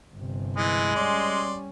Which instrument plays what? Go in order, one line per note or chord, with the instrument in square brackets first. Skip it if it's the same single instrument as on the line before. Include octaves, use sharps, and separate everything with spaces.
[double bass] G1 C3
[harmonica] E3 [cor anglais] G#3
[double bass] G3 C#4 [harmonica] D5 C6